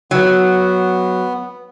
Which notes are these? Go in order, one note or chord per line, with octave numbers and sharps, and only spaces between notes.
F#3 B3